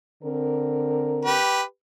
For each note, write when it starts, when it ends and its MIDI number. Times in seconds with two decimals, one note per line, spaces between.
0.23 1.39 50
0.23 1.39 60
0.23 1.39 70
1.25 1.62 67
1.25 1.62 71